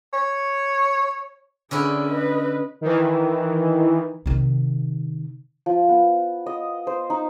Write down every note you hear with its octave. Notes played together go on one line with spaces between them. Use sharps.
C#5
D3 C#4 E4 G#4 D5
B4 D#5
D#3 E3
C3 D#3
F3
B3
D#5
C5
D#4